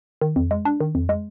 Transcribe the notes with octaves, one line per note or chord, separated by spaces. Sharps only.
D#3
F2
G#3
D4
D#3
F2
G#3